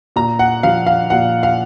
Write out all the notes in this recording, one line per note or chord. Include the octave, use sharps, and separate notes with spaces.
A#2 A#5
F#5
F3 F5
F5
A#2 F#5
F5